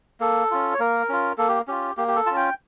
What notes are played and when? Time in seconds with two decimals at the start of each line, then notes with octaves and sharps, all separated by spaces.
0.20 A#3 A4
0.51 C#4 F4
0.74 C#5
0.79 A#3 A#4
1.09 C#4 F4
1.38 A#3 A4
1.49 G4
1.68 C#4 F4 G4
1.97 A#3 G4
2.08 G4
2.16 A4
2.26 C#4 F4 A5
2.36 G5